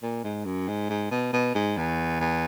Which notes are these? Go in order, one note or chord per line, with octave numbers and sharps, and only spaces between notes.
A#2
G#2
F#2
G#2
G#2
B2
B2
G#2
E2
E2